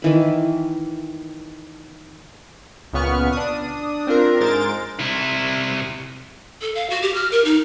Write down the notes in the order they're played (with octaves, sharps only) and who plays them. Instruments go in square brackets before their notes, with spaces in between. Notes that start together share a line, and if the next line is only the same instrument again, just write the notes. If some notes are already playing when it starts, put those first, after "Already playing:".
[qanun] D#3 E3 B5
[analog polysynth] C#2 A#2 C#3 B3 C#6 F6
D4 D#6
C4 D4 F4 A#4
G#2 G#3 A#4 C5 A6 D7
[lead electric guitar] C3 E4
[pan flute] A4
F5
F#4
G4
F6
A#4
D#4